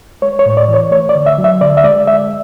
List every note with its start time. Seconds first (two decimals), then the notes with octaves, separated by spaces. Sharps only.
0.22 G#3 C#5
0.39 C#5
0.46 A2
0.57 D5
0.68 E3
0.74 C#5
0.91 A3 C#5
1.09 D5
1.15 D3
1.26 E5
1.38 F#3
1.44 E5
1.61 D3 D5
1.77 E5
1.84 G#3 D5
2.07 G#3 E5